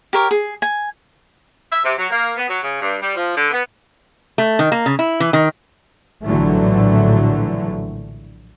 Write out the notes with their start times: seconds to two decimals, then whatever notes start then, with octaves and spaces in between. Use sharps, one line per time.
0.13 G4 A#4 C#5
0.31 G#4
0.62 G#5
1.70 E5
1.83 C3
1.98 F#3
2.10 A#3
2.37 B3
2.48 F#3
2.63 C#3
2.81 G2
3.00 G3
3.15 F3
3.36 D3
3.51 B3
4.38 A3
4.59 D#3
4.72 A#3
4.86 C#3
4.99 E4
5.20 E3
5.33 D#3
6.24 A#1 A2 D3 E3 F#3 A3